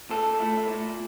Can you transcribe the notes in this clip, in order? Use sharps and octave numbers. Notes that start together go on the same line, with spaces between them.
A#2 A4
A3 E4
A#2